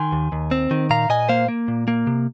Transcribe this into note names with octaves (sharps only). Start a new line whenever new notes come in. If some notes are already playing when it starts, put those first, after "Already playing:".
Already playing: D#3 G#5 C6
D#2
D#2
C4
D#3
A#2 F5 A#5
A#2 D#5 G#5
A#3 C5 F5
A#3
A#2
A#3
C3